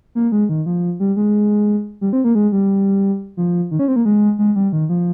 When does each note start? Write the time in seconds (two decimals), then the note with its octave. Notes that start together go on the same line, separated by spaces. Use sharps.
0.15 A#3
0.32 G#3
0.49 D#3
0.66 F3
1.00 G3
1.17 G#3
2.01 G3
2.13 C4
2.24 A#3
2.35 G#3
2.52 G3
3.37 F3
3.71 D#3
3.79 C#4
3.88 C4
3.96 A#3
4.05 G#3
4.39 G#3
4.56 G3
4.73 D#3
4.89 F3